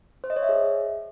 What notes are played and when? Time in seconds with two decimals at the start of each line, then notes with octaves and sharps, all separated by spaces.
0.24 C5
0.30 D#5
0.36 C#5
0.43 E5
0.49 G#4